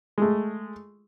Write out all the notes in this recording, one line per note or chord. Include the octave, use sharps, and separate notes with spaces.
G#3 A3